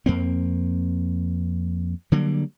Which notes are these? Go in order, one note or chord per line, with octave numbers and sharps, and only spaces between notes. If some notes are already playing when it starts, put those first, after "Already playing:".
F2 A#3 C4
D3 F#3 G3 A#3